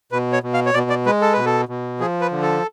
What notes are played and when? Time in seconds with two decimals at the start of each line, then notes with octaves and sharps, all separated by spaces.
0.12 B2 B4
0.33 C#5
0.43 B2
0.54 F5
0.66 C#5
0.74 B2 D5
0.90 D5
1.06 G#3 B4
1.22 A4
1.33 B2 B4
1.45 A4
1.69 B2
2.00 F3 G#4
2.21 B4
2.32 D3
2.42 A4